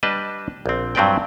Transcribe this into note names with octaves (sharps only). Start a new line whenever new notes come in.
G3 D4 B4 D#5 A5
A#1 C4
G2 F#3 C4 B4 D5 G5